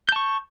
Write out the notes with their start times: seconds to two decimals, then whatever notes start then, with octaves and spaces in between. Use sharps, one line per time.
0.09 G6
0.12 A5
0.16 C#6